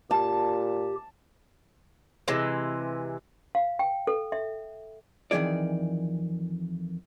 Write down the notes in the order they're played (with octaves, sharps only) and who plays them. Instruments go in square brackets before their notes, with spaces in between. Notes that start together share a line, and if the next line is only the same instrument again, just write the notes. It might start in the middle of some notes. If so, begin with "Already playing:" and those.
[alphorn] A#2 [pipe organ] G4 [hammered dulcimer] A5
[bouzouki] C3 E3 G#3
[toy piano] F5
G5
A4
E5
[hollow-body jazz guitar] F2 D#3 E3 A3 G#4 D5